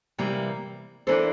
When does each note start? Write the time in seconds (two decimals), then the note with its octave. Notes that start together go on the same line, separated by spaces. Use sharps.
0.18 C3 E3 G3 A#3
1.07 E3 A#3 D4 A4 C5